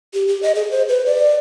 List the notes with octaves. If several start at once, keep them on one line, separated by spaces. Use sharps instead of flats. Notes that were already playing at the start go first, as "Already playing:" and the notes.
G4
G4
D#5
G#4
C5
B4
D5